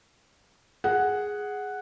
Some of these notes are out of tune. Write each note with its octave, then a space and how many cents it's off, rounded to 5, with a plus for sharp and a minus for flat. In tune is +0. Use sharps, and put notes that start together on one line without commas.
G#4 +0 F#5 +0